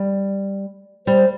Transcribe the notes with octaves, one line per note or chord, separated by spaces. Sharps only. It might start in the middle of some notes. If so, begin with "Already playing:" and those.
Already playing: G3
G3 C5